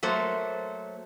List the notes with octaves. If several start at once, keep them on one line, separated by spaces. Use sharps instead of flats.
F#3 A3 A#3 C5